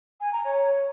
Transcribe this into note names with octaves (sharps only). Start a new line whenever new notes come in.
G#5
A#5
C#5